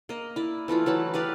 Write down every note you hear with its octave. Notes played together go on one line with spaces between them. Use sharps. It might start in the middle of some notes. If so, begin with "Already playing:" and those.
A#3 D#5
E4 D5
E3 A3 E4 F4
E3 F#3 A5 B5
G4 B4 D5 F5